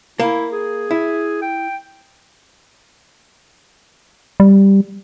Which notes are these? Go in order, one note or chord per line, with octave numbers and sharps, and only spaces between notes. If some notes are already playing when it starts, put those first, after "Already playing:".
A#3 E4
G#4
E4
G5
G3